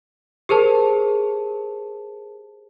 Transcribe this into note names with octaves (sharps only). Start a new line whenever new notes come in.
G4 G#4 A#4 C5 A5